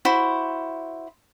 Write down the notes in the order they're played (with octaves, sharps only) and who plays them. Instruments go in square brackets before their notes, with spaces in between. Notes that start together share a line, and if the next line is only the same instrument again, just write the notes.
[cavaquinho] E4 F#4 C5